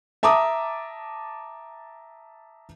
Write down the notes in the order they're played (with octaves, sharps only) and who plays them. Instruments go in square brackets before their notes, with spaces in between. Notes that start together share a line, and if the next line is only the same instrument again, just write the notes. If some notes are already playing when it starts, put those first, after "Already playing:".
[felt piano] E5 A5 A#5 D6 D#6